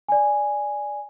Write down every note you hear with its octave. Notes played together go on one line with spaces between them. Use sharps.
D5 G#5